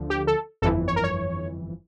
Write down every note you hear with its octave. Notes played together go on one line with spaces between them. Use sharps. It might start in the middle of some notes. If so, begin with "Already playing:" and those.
Already playing: D2 D3 F3
G4
A4
G1 F2 E3 A4
C#5
A#4
C#5